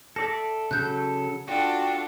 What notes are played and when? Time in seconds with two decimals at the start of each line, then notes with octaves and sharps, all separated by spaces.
0.16 A4 D5 E5 A#6
0.71 C#3 F#3 A4 F#6 G6
1.48 D4 F4 F#4 A4 G5